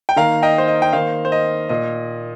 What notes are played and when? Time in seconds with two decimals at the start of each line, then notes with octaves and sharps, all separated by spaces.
0.09 G5
0.16 D#3 A#3 F5 A#5
0.43 D#5 G5
0.58 C5
0.68 D#5
0.82 G5
0.93 D#3 A#3 C5 F5
1.25 C5
1.32 D#5
1.69 A#2 A#3 D#5